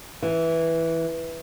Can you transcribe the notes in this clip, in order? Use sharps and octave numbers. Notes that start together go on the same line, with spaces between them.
E3